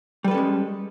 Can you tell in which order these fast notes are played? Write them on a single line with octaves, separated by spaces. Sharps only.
G3 B4 A4 C#4 G#3